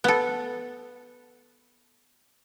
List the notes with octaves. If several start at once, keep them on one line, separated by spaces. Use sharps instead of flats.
B3 A4